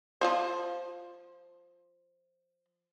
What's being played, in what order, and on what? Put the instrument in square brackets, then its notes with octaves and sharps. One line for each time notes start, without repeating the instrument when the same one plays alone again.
[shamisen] F3 F4 C5